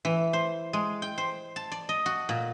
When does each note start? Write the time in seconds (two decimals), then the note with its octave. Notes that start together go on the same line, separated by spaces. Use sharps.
0.05 E3
0.33 C5
0.73 G#3
1.02 G5
1.18 C5
1.56 A5
1.72 D5
1.89 D#5
2.06 F#4
2.29 A#2